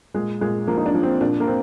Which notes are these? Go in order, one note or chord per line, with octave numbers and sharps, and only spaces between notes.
A#2 G#3
A#2 G#3
F3 A#3
D#4
D4
F3
C4
A#2 D4
A#3
C4